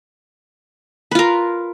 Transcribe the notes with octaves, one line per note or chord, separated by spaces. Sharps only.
F4 A#4 B4